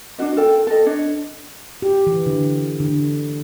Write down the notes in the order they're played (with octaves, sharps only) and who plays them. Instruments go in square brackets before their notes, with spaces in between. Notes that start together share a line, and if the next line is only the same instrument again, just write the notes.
[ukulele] D4 D#4 F#4 D#5
F4 A4 G5
A4 D#5
D4 C#5 D#5
[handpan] G4
E3
D3
D3